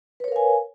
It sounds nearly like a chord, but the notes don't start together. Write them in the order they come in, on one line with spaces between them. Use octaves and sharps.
B4 C#5 A#4 F5 G#5